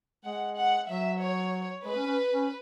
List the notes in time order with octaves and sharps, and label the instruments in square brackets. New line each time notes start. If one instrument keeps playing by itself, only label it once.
[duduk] G#3 [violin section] F#5
[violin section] F#5
[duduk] F#3 [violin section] E5
[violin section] C#5
[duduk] G#3 [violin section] B4
[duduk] C#4
C#4
C#4